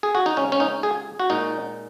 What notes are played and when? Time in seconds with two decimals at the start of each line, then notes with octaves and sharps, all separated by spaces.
0.03 G#4
0.15 F#4
0.26 D#4
0.36 C#3 G#3 C#4
0.52 C#4
0.60 D#4
0.83 G#4
1.20 F#4
1.30 A#2 G#3 D#4